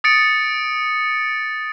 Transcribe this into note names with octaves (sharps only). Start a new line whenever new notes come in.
D#6 A6 C#7 D7